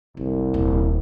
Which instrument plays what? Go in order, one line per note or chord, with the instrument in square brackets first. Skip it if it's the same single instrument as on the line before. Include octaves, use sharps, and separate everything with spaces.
[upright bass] F#1 [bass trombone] C2
[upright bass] D#1 A#3